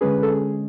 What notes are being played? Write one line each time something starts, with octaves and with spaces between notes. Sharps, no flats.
D3 G#3 C#4 G#4 B4
A4
G#4